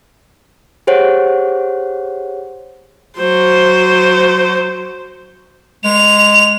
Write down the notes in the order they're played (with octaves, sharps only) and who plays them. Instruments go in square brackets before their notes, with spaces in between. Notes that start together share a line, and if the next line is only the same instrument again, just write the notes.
[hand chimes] G4 G#4 C5 C#5 F#5
[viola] F#3 C5
[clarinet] G#3 [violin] F7